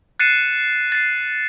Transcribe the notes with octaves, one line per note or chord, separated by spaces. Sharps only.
F#6 A6 C7 C#7 D#7 E7
A6 C7